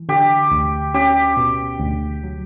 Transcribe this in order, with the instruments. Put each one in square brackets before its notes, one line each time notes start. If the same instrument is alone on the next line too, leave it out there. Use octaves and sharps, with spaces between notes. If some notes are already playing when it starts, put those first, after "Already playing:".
Already playing: [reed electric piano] E3
[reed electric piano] D3 [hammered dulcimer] G4
[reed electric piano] D2
[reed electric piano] C#4 [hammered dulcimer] G4
[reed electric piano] B2
D2
F#3